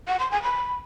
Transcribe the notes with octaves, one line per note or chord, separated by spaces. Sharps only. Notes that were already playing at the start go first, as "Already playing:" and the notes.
F#5
C6
G#5
B5